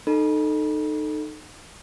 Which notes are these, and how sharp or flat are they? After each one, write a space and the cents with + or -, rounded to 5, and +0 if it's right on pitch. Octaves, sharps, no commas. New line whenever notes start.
D#4 -20 A4 +0 B5 -35